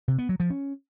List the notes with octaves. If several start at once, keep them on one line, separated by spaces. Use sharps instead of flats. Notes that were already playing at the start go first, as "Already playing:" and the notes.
C3
B3
F#3
F3
C#4